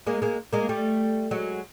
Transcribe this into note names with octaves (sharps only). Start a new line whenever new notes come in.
G#3 A#3
G#3 A#3
G#3 A#3
G3 A3
F#3 G#3